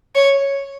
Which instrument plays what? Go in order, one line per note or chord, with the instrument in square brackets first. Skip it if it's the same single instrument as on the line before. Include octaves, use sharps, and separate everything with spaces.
[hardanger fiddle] C#5